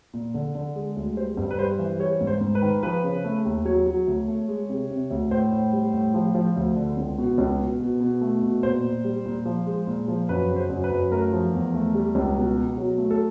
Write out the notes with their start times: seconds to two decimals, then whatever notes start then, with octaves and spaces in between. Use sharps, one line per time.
0.13 A#2
0.34 D3
0.55 D3
0.76 G#3
0.96 D2
1.17 G3 C5
1.37 G2
1.51 B4
1.58 G3 C5
1.79 E3
1.99 G3 C#5
2.21 G#2
2.27 C5
2.41 G#2
2.55 B4
2.62 D#3
2.83 F3 B4
3.03 C#3
3.24 A3
3.45 D#2
3.65 F#3 C#5
3.87 F#3
4.07 D2
4.28 A3
4.48 G#3
4.69 C3
4.90 C3
5.10 D2
5.31 A2 C5
5.52 A2
5.73 G3
5.94 A2
6.14 F3
6.35 F3
6.56 D2
6.76 D3
6.97 C#2
7.18 B2
7.38 C#2
7.59 B2
7.80 B2
8.00 B2
8.21 A3
8.42 B2
8.63 A#2 C5
8.84 A#2
9.04 G3
9.26 A#2
9.46 F3
9.67 G#3
9.87 A#2
10.08 F3
10.29 F#2 B4
10.50 C#3
10.56 C5
10.70 F#2
10.84 B4
10.91 F#2
11.12 A3 A#4
11.32 F3
11.53 E2
11.74 A3
11.94 G3
12.15 C#2
12.36 B2
12.57 B2
12.78 F#3
12.98 A3
13.11 A4